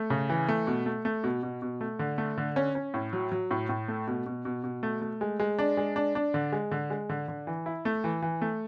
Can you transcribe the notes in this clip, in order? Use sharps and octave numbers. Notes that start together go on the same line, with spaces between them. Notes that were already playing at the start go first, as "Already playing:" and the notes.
Already playing: A3
C#3
E3
A3
B2
A3
A3
B2
B2
B2
A3
D3
A3
D3
C#4
C#4
A2
F#3
F#3
A2
A2
A3
B2
B2
B2
B2
A3
A3
G#3
G#3
D4
G#3
D4
D4
D3
G#3
D3
G#3
D3
D3
E3
E4
A3
E3
E3
A3